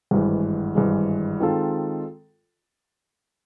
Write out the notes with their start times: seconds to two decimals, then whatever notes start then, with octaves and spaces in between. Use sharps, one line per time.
0.11 G#1 G2 E3 G#3
0.75 G#1 G2 E3 G#3
1.40 D#3 G#3 C4 F4 A4